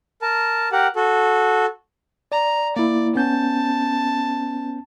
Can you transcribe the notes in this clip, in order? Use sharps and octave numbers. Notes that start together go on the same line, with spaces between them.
A#4 A5
G4 A#4 F#5
F#4 A4
D5 A#5
A#3 E4 D5
B3 C#4 A5 G6